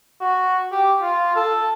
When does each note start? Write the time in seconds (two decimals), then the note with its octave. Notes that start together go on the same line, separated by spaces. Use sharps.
0.22 F#4
0.72 G4
1.01 F4
1.36 A4